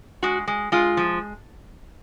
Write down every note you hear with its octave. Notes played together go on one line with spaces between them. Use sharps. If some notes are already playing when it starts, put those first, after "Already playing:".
G#3 F#4
G#3
G#3 F4
F3